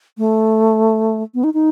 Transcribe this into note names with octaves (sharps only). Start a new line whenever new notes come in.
A3
B3
D#4
D#4